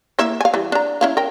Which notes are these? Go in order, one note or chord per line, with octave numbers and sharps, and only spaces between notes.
A#3 E4 E5
F5 G#5
E3 G3
D4 A#5
C#4 E4 F5
A#4 G5